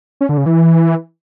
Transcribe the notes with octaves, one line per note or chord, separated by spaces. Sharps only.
C#4
D3
C#3
E3